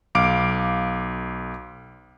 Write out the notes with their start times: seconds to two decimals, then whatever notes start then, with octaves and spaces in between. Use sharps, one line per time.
0.15 B1 F5 D6 D7